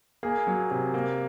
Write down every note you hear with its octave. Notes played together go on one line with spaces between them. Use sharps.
A#3 G#4
F#3
C3
A#3